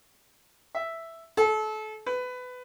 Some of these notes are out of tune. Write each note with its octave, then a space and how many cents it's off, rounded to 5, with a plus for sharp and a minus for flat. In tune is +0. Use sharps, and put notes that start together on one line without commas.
E5 +0
A4 -30
B4 +20